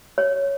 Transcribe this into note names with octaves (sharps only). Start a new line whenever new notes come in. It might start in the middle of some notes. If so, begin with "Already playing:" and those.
C#5